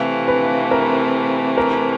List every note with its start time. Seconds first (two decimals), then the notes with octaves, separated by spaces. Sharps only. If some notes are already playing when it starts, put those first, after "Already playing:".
Already playing: C3 E3 A3 F5
0.28 B4
0.71 A#4
1.58 A#4